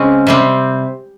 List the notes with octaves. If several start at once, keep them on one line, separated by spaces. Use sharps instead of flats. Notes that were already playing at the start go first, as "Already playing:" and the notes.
Already playing: C#3 G#3 C4 C#4
C3 G3 C4